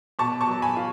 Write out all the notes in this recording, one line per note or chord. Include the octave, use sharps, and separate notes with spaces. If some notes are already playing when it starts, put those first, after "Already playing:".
B2 A5 C#6
A5 C#6
F#3
G#5 B5
F4